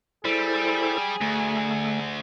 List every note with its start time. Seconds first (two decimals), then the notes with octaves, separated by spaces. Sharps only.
0.25 G3 E4 G#4 A4 C5
1.21 D2 A3